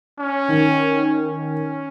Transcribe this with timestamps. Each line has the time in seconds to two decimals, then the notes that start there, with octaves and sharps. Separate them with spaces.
0.20 C#4
0.48 D#3
1.06 C#4